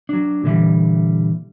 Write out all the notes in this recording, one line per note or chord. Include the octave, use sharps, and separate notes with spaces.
F#3 D4
A#2 D3 E3 G3